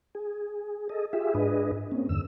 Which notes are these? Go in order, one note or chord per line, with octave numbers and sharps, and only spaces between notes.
G#4
G#4 A4 D#5
F4 G4 G#4 E5
G#2 D4 G#4 B4 D#5
A#3 C4 C#4
E2 G2 D3 E6